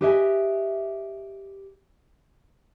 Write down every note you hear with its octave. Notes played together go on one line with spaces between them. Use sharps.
G4 B4 D#5 E5 F#5 G#5